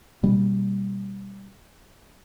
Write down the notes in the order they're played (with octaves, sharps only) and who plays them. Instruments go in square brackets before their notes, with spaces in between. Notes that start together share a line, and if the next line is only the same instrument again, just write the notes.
[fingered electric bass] B2 G3 A#3 C#4